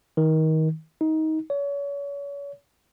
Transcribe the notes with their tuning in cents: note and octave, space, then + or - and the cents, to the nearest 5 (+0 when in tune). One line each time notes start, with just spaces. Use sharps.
D#3 +25
D#4 +20
C#5 +35